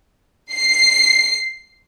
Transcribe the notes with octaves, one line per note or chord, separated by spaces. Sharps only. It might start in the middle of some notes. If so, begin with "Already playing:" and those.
C7